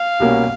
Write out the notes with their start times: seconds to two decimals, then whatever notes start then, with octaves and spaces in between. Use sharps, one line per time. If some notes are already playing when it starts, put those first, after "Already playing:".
Already playing: F5
0.20 C2 B2 G3 A#3 C#4